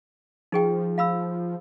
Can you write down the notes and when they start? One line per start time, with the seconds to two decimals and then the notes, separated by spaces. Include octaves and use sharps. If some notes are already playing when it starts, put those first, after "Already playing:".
0.52 F3 D#4 G#4 G5
0.98 F5 B5 E6